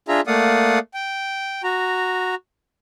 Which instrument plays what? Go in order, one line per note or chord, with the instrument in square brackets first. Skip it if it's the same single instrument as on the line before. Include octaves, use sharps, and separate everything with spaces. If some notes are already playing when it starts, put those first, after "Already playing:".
[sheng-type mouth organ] D4 F4 G#4 E5 A#5
A3 A#3 D5 F5 F#5 D#6
G5
F#4 A#5